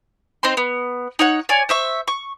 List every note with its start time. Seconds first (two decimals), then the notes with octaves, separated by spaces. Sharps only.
0.43 C4 D#4 C5 C6
0.57 B3
1.19 D#4 C#5 F#5
1.49 C#5 D5 G#5
1.69 C5 E5 C#6
2.08 C#6